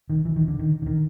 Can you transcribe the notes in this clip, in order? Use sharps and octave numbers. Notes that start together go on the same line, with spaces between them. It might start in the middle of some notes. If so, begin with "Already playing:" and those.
D#3
E3
D#3
D3
D#3
D3
D#3